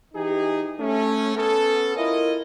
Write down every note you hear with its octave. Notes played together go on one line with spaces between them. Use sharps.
E3 D#4 G4 G#4
A3 C#4
B3 C#4 A4
E4 F4 A#4 D#5